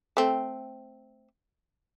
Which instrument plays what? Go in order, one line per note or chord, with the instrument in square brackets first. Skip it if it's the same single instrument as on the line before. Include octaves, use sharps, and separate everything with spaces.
[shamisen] A3 C4